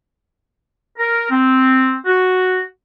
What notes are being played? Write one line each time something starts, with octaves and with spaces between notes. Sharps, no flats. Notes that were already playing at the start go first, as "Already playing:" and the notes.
A#4
C4
F#4